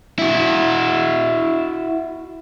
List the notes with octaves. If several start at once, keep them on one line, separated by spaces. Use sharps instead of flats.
E4 F#4